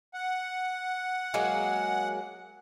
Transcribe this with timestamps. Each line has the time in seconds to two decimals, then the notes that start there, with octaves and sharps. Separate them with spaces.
0.14 F#5
1.34 F#3 G#3 A#3